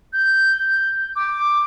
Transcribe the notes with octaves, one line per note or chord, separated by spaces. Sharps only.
G6
D6